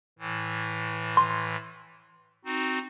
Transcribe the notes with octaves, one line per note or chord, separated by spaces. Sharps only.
A2 E3
C6
C4 D#4 F#4